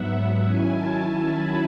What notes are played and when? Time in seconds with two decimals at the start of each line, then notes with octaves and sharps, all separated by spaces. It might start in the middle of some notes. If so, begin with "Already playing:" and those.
Already playing: G#2 F#3 B3 E5 F#5
0.44 D#3 F#3 C#4 E4 G#5
0.72 A5
1.28 B5